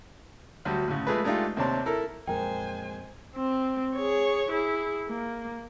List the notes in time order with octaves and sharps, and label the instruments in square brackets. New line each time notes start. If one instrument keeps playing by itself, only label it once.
[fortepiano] D2 F#3 G3
D2 A2 C#3
F3 G#3 A3 G#4 B4
G#3 A3 D4 D#4 F4 G4
D#2 C3 C4 D4 C#5 A5
E4 A4 A#4
[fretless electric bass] F2 A#2 F#3 [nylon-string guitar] G#3 A#4 [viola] C5 G#5 [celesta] G5
[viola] C4
G#4 C#5
E4 G#4
A#3